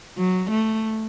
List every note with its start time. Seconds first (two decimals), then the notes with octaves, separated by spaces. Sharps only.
0.17 F#3
0.50 A3